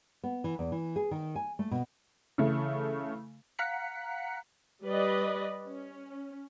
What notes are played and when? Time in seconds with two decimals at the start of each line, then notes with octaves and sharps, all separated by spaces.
0.24 B3
0.44 E3
0.59 E2
0.72 E3
0.96 G#4
1.11 D#3
1.35 G#5
1.59 A3
1.71 B2
2.38 C#3 E3 A3
3.59 F5 F#5 A#5 F#6 B6 C#7
4.84 G3 B4 D5 D#5
5.67 C#4